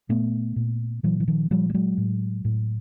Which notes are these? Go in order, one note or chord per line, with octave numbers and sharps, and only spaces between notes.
A#2 A3 B3
A#2
A#2 E3 F#3
E3
D#3 F3
A#2 F3 G3
G3
F#3 G#3
A2
A2